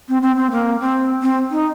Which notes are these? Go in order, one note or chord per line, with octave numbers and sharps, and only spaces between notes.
C4
C4
C4
A#3
C4
C4
D#4